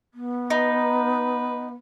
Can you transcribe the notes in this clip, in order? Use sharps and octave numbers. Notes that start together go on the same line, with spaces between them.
B3
D#4 B4